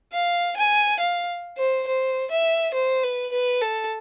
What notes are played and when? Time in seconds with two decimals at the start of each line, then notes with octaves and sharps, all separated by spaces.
0.13 F5
0.57 G#5
1.00 F5
1.58 C5
1.87 C5
2.31 E5
2.74 C5
3.03 B4
3.32 B4
3.61 A4